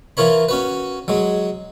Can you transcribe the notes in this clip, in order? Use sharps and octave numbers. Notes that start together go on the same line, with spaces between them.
E3 F4 A#4 C#5 B5
C#4 F#4 B4
F#3 G#3